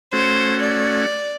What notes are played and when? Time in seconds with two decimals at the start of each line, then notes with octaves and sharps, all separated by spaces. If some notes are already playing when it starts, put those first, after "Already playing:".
0.13 A3 C#4 F#4 C5
0.62 D5